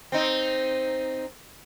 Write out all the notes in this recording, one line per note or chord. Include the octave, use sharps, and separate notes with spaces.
C4 D#4